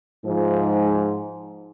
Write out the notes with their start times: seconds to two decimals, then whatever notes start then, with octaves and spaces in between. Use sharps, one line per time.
0.25 G#2 F3